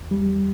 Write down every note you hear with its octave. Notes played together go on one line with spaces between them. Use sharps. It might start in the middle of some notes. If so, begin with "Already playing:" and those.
Already playing: E2
G3